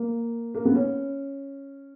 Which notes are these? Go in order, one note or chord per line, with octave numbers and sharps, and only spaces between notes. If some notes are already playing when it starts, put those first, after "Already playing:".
Already playing: A#3
A#3
B3
C#4